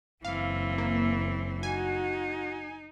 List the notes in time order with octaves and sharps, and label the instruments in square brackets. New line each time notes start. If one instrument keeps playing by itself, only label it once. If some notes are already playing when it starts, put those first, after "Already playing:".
[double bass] F#1 [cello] E3 C4 [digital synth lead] F5
[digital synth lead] A#3
[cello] D#4 [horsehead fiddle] F#4 [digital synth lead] G#5